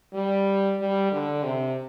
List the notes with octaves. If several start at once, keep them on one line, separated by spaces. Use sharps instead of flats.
G3
G3
D3
C3